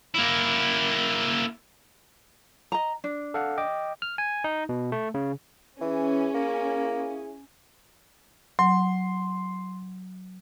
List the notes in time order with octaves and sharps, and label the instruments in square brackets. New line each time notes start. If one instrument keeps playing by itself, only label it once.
[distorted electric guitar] A#3 E4
[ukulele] D#5 A#5
D4
[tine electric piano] A4 F5 F#5
D#5 G5 D6
F6
G#5
D#4
B2
A3
C#3
[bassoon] E3 [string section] C#4 [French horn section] E4 G#4
[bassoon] A#3
[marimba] F#3 [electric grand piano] C6